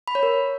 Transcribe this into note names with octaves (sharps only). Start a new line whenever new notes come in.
B5
C#5
A#4